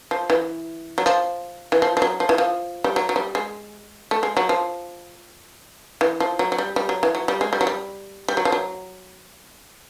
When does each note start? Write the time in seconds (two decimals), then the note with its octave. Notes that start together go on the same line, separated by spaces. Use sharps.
0.11 F3
0.30 E3
0.98 F#3
1.06 F3
1.72 E3
1.82 F3
1.97 F3
2.02 F#3
2.20 F3
2.29 E3
2.38 F3
2.84 G3
2.96 F#3
3.09 F#3
3.16 G3
3.35 G#3
4.11 A3
4.23 G#3
4.37 F#3
4.49 F3
6.01 E3
6.20 F3
6.39 F#3
6.52 F#3
6.58 G3
6.76 G3
6.89 F#3
7.03 E3
7.15 F#3
7.28 G3
7.41 G#3
7.53 G3
7.61 F#3
7.67 G3
8.28 G3
8.37 F#3
8.45 F3
8.52 F#3